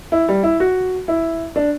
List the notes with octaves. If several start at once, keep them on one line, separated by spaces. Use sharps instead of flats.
E4
G3
E4
F#4
E4
D4